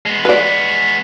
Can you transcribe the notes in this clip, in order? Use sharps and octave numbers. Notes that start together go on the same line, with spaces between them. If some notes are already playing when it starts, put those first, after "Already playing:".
G#3 B3
B4 D5